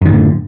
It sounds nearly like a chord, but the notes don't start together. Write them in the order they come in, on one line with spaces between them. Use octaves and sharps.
F#2 D#3 A2 D3